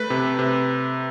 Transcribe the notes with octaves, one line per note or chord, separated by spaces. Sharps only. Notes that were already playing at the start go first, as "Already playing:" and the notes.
Already playing: A3 B4
C3
C3